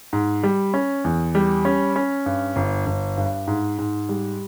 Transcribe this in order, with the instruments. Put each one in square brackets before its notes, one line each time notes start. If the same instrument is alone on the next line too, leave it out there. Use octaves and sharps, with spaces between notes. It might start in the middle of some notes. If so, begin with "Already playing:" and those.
[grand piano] G#2
G3
C#4
E2
G3
C#4
C#4
G2
G1
G1
G2
G#2
G#2
G3